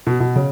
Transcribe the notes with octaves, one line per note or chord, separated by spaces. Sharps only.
B2
B2
C#3